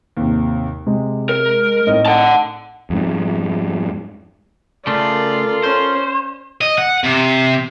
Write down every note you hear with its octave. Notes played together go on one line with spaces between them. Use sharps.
D#2 G#2 C3
C3 G#3
A#4
A2 C4 D#4 D#5
F#5 A5
F2 G#2
C#3 A3 F4 A4 A#4 D5
C#4 C5
D#5
F#5
C3